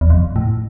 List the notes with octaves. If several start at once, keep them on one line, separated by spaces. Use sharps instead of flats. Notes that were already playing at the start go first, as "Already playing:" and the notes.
E2
F2
A2